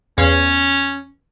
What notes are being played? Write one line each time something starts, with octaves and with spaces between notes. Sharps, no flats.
E2 C#4 C#5 F5